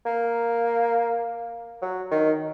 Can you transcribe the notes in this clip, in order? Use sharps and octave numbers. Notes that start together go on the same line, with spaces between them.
A#3
F#3
D#3